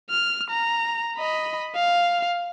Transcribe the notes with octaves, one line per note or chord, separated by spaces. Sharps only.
F6
A#5
D#5 B5
F5